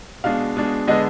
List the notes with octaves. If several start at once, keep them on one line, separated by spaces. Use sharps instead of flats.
B2 G#3 D4 F5
B2 G#3 D4
D3 G#3 B3 D4 D#5